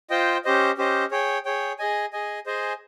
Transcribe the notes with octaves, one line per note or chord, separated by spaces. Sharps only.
F4 C5 D#5 G5
C#4 G4 C5 D#5
C#4 G4 C5 D#5
G#4 C#5 G5
G#4 C#5 G5
G#4 D#5 G#5
G#4 D#5 G#5
G#4 C5 D#5 G#5